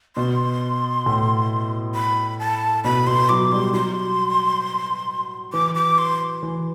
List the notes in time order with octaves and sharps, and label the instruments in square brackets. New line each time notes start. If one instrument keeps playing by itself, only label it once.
[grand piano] B2 [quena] C6
[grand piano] A2
[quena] B5
A5
[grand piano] B2 [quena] B5
[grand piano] B2 [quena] C6
[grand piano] F#3 [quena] D6
[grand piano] G3 [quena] C6
[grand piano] F#3 [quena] C6
[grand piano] E3 [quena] D6
[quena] D6
C6
[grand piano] E3